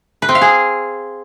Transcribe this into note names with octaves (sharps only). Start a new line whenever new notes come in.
B4
C4
F5
G#4